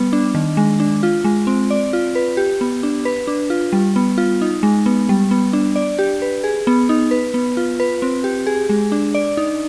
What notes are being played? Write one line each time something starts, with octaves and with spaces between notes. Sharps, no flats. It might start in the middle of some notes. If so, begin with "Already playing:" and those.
Already playing: G3 B3
D4
D#3
G#3
D4
F4
G#3
C4
D5
F4
B4
G4
B3
D4
B4
D4
F4
G3
B3
F4
D#4
G#3
B3
G3
B3
D4
D5
G4
B4
G#4
B3
D#4
B4
B3
F4
B4
C4
G4
G#4
G#3
D4
D5
D#4